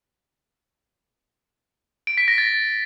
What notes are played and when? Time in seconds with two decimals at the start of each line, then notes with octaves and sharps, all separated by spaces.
2.07 D7
2.18 B6
2.28 A#6
2.38 A6